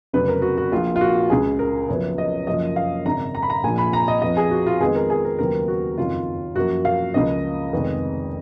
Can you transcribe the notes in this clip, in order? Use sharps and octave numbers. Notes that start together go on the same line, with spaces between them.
F1 F2 C#3 F#3 B3 B4
A#4
F#4
F#4
A#1 A#2 F3 A#3 F4
F4
F#4
C#2 C#3 G#3 G#4
A#4
F#1 F#2 F3 B3
D#5
F#1 F#2 F3 A#3 D#5
F5
G#1 F#2 C#3 A#5
A#5
B5
A#5
A#1 A#2 F3 G#5
B5
A#5
D#5
F2 F3 B3 D#5
G#4
F#4
F4
F2 D#3 G#3 B3 G#4
A#4
G#4
A#4
D#2 C#3 F#3 B3 A#4
F#4
F#1 F2 D#3 F4
F#2 F3 A#3 F#4
F5
C#2 C#3 F3 A#3 D#5
F1 F2 D#3 G#3 B3